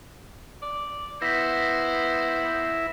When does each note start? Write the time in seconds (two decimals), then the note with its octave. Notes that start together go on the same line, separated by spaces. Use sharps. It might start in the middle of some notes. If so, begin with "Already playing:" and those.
0.62 D5
1.22 B3 E4 C5 A#6 B6